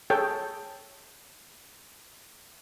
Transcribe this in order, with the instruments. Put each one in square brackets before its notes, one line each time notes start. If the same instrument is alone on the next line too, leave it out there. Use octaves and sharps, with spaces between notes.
[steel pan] G#4 A4 C#5 G5